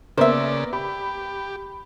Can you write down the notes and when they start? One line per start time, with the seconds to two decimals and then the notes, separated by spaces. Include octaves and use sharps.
0.18 C#3 A#3 B3 A#4 C5 D5 E5
0.73 G4 B5